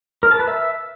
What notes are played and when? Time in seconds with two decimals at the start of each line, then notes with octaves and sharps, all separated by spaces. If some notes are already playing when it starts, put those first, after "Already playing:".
0.23 A#4
0.31 A5
0.39 B4
0.48 E5